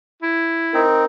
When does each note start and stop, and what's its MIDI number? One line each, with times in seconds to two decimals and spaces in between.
0.22 0.83 64
0.74 1.05 60
0.74 1.05 63
0.74 1.05 70